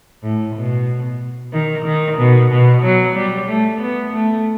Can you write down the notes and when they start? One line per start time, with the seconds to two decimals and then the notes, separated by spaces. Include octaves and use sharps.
0.23 A2
0.55 B2
1.53 D#3
1.85 D#3
2.18 B2
2.51 B2
2.83 F#3
3.15 G3
3.49 A3
3.81 B3
4.13 A3